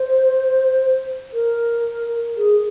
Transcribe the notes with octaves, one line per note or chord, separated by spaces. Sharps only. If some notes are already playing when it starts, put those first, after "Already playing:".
Already playing: C5
A#4
G#4